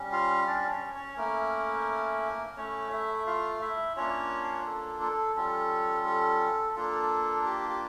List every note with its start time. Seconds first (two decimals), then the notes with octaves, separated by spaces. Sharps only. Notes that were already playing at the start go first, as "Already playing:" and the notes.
Already playing: G3 C#4
0.12 F4 F5
0.47 D4 D5
0.71 C#4 C#5
0.94 C#4 C#5
1.17 A3 A#3 C#4 E4 A#4
2.57 A3 C#4 E4 C#5
2.91 E4 E5
3.26 F4 F5
3.61 E4 E5
3.96 A#3 C#4 D4 F4 C#5
4.66 A4
5.01 A4
5.36 G3 C#4 F4 A4
6.06 A4
6.76 A#3 D4 F4 A4
7.45 G4
7.69 G4